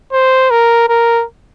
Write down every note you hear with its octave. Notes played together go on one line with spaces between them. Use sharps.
C5
A#4
A#4